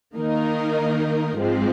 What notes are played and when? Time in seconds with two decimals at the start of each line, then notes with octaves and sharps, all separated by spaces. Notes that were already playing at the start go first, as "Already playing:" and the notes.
0.15 D#3 A#3 D#4 A#4
1.38 G#2 F3 G#3 C4